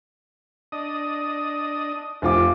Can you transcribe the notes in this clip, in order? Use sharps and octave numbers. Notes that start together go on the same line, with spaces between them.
D4 D#5 D#6
F1 F4 D6